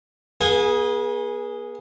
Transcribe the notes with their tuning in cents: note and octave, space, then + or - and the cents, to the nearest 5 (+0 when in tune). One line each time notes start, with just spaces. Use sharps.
B3 -45 G#4 +0 G#5 -20